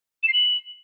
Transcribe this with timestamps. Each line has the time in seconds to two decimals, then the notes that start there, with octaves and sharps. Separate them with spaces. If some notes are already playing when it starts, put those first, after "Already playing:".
0.23 E7
0.28 C7
0.33 F#7